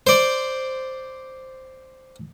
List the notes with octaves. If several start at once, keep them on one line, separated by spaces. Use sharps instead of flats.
C5 D5